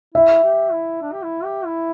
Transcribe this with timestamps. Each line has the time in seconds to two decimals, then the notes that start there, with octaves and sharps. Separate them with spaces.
0.14 E4 E5
0.43 G4
0.72 E4
1.01 D4
1.12 G4
1.23 E4
1.44 G4
1.65 E4